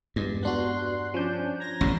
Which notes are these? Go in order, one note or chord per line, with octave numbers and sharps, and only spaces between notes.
E2 G2 G#3
B3 D4 F#4 C6 F#6
F3 C#4 D4 G6
A#5 G#6 A#6
A1 F#2 B2 C#4